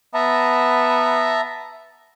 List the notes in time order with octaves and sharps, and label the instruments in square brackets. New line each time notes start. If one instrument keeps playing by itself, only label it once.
[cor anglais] B3 [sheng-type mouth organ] E5 A5 A#5